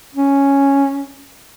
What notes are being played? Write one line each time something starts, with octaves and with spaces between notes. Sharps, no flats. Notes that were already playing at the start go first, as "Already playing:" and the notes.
C#4